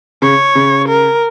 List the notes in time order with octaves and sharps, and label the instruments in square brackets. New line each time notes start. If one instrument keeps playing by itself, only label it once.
[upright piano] C#3 [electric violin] C#5
[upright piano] C#3
[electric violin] A#4